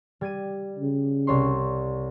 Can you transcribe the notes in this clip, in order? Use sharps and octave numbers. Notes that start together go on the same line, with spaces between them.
G3 G#6 D#7
C#3
C2 C#5 C6